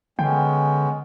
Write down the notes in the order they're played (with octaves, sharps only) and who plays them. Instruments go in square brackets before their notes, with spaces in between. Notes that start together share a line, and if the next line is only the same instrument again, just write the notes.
[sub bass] D3 [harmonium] G#3 B3 C#4 [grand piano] G5